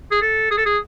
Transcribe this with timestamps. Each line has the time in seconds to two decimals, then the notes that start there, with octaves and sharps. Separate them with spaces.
0.11 G#4
0.22 A4
0.51 G#4
0.57 A4
0.66 G#4